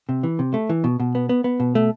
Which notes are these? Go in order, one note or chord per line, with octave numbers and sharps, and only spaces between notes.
C3
E3
C3
A3
E3
B2
B2
B3
B3
B3
B2
A3